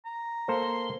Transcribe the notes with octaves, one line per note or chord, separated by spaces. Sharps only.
A#5
A#3 A4 C5 C6